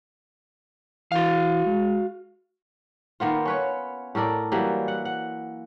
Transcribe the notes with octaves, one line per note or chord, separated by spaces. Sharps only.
E3 F#4 F5
G#3
D#3 A#3 B3 F4
C#4 B4 C#5
A2 A4 A#4 D5
E3 F#3 G3 A#3
F#5
F#5